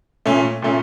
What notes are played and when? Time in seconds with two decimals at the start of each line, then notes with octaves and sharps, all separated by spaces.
0.26 A#2 A3 C#4
0.62 A#2 A3 C#4